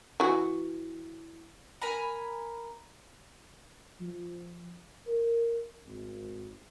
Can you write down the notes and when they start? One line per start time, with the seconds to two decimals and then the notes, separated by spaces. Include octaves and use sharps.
0.20 E3 F#4
1.82 A#4 G#5 A#5 B5
4.00 F3
5.07 A#4
5.86 G#1